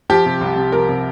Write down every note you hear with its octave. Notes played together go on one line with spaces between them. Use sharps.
F3 G4
C3
C2
C2
F3 A#4
C3